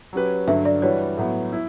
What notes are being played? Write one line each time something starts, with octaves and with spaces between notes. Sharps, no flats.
F#3 C#4 G4 B4
G2 D3 F#3 E5
D5
E3 G3 D4 F#4 B4 C#5
A2 F#3 B3
E4